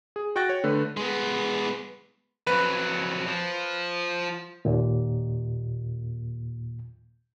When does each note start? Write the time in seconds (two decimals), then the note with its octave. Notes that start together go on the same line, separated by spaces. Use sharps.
0.16 G#4
0.36 F#4 G5 C#6 F#6 A6 A#6
0.49 C#5
0.64 D3 A3 B4
0.97 G#3 B3
2.47 F2 F#3 B4
3.27 F3
4.65 D#2 A#2